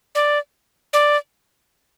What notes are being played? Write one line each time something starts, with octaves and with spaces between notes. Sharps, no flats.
D5
D5